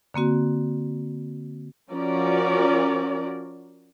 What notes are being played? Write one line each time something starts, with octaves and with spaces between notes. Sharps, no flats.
D3 A#3 C4 F#4
F3 C#4 F#4 A#4 D5